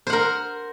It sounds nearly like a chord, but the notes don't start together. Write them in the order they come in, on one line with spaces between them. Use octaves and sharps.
C5 F#5 A#4